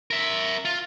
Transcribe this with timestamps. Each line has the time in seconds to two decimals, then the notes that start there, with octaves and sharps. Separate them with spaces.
0.11 A#4 E5
0.65 F4